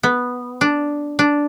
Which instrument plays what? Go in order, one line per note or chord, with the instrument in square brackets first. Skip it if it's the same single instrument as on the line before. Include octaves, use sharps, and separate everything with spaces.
[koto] B3
D4
D4